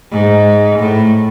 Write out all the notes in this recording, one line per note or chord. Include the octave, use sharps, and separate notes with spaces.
G#2
A2